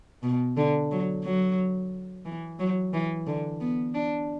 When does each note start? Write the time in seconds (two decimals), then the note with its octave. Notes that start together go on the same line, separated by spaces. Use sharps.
0.23 B2
0.57 D3
0.91 F#3
1.25 F#3
2.25 E3
2.59 F#3
2.94 E3
3.27 D3
3.61 B3
3.94 D4